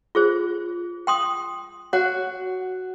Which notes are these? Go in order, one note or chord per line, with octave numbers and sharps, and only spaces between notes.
F4 G#4 C5
G5 C6 D#6
F#4 C#5 F#5